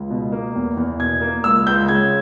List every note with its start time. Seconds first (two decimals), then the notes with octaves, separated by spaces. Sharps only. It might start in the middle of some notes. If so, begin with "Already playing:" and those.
Already playing: C#2
0.10 B2
0.32 A#3
0.55 E2
0.77 E2
1.00 B2 G#6
1.21 A#3
1.44 C#2 E6
1.67 C#2 G6
1.88 C#3 G#6